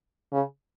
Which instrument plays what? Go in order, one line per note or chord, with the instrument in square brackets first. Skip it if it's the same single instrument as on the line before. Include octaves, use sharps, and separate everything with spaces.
[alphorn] C#3